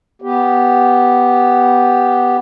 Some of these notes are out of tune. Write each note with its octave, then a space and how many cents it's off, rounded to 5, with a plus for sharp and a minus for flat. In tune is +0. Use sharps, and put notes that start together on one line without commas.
B3 +0 G4 +0